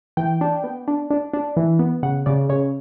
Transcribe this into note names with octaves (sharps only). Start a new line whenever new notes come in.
E3 G5
D4
B3
D4
D4
D4
E3
B3
C#3 F#5
C#3 D5
C#3 C#5